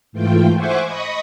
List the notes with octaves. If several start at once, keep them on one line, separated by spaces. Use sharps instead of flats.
G#2 E3 A3 F4 G5
C5 E5 F#5 G#5 C#6 D6
D#5 B5 C#6 D#6